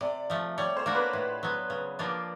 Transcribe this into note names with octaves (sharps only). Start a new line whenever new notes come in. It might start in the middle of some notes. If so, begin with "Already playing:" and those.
C3 D5
F3 A3
G3 C#5
C5
A#3 D4 F#4
B4
A2
F#3 B3
C#3
F3 A#3 D4 F4